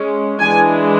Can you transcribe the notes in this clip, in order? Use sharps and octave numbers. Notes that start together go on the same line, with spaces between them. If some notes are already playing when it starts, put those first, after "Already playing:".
Already playing: G#3 C#4
E3 G#3 D4 G#5